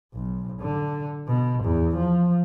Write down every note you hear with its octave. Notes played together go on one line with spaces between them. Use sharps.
B1
D3
B2
E2
F3